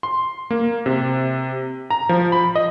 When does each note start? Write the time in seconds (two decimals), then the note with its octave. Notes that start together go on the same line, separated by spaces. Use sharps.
0.03 C6
0.50 A#3
0.86 C3
1.90 A#5
2.09 F3
2.32 B5
2.55 D#5